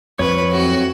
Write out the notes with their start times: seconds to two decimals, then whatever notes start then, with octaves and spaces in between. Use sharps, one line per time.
0.19 F2 F3 B4 C#5 C#6
0.52 A2 F#3 C4 F#4